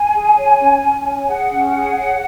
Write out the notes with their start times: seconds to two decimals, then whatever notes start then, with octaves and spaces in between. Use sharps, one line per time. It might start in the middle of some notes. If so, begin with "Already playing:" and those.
Already playing: G#5
0.13 G#4
0.36 C#5
0.60 C#4
0.82 C#4
1.05 C#5
1.28 G#4 F#5
1.51 C#4
1.74 G#4
1.97 C#5